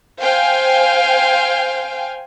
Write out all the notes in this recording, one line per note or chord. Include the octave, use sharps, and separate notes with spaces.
C5 F5 G5 G#5